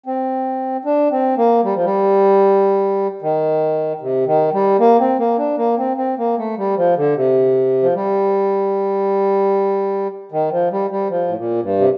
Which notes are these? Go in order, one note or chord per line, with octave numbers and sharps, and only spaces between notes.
C4
D4
C4
A#3
G3
F3
G3
D#3
C3
D#3
G3
A#3
C4
A#3
D4
A#3
C4
C4
A#3
A3
G3
F3
D3
C3
F3
G3
D#3
F3
G3
G3
F3
A2
A#2
G2
C3